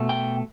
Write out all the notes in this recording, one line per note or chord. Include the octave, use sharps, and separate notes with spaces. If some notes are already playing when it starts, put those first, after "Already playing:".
Already playing: B2 A3
G5